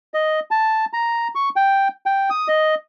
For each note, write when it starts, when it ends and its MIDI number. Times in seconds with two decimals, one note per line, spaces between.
0.14 0.40 75
0.51 0.85 81
0.93 1.28 82
1.35 1.49 85
1.56 1.88 79
2.06 2.30 79
2.30 2.48 87
2.48 2.75 75